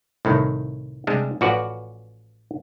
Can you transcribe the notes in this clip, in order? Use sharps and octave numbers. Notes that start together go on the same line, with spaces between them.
C2 A2 D#3
C3 G3 G#3 D4
A1 F3 F#4 B4 D5 F#5